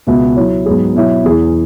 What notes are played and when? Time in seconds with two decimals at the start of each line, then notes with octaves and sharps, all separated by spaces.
0.07 C#2 B2 B3 F#4 E5
0.36 F#3 E4 C#5
0.66 G#2 F#3 B3 G#4
0.95 B2 F#3 E4 C#5 E5
1.24 E2 E3 B3 G#4